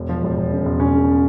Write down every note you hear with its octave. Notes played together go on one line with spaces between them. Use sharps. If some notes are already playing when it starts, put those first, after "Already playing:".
Already playing: E1
F3
E1
E1
C#3
E1
E1 C#4
C#3